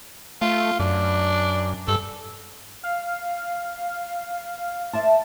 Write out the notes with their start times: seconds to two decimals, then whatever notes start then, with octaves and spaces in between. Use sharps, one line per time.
0.42 A3 F4
0.80 F#2 D4
1.88 G2 A4
2.83 F5
4.93 C5 D5 E5 A5